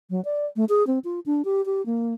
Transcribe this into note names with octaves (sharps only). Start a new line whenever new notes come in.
F#3
D5
A3
G#4
C4
F4
D4
G4
G4
A#3